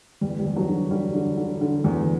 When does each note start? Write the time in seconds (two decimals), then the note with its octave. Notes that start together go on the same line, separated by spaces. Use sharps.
0.21 E2 G3
0.39 G3
0.44 E2
0.56 F#3
0.68 D3
0.91 D3 G3
1.14 D3
1.37 D3
1.61 D3
1.84 E2